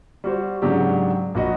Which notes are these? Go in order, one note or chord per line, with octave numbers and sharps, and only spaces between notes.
G3 F#4 C5
G#2 C#3 F#3 D4 G4
A#1 F#4 D#5